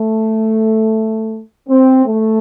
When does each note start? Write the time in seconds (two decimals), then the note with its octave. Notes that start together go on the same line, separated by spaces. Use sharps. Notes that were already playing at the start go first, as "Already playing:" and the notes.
Already playing: A3
1.69 C4
2.06 A3